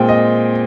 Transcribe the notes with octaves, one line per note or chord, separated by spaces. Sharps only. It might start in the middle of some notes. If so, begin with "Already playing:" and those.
Already playing: A#2 G#3 C4 G5
D#5